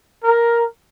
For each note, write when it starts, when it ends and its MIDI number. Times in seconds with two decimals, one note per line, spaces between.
0.24 0.63 70